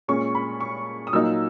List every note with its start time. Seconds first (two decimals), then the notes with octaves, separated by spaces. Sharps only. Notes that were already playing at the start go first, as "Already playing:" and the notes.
0.08 A#2 G#3 C#4 C#6
0.35 B5
0.60 C#6
1.07 D#6
1.13 A#2 F#3 A#3 D#4 E6